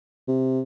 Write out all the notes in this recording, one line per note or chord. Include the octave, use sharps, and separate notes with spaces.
C3